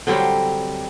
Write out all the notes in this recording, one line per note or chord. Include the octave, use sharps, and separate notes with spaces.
D3 F#3 G3 C4